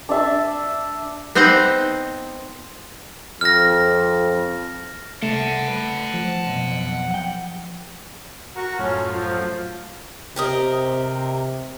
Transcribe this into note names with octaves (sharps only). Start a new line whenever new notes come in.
D4 E5 A5
B3 C4 D#4 C5 F#5
F2 F6 A#6
C2 A3 F#5 A5
B4
F3
B1 F2
F#5 G5
F#4 A#4
F#2 A2 C#4 F4
F3
C3 G4 A#4 D#5